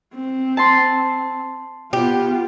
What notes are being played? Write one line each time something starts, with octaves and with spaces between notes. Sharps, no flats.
C4
A5 C6
B3 F4 G4